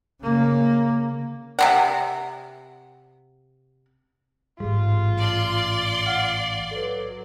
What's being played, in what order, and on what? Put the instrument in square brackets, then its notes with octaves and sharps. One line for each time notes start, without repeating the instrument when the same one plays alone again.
[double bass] C#3 A#3
[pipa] C3 C4 F#5
[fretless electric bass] A1 G3 [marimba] G#2 [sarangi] F4
[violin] D5 C6
[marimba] F5 F#5 F6
[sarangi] F#3 [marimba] A4 B4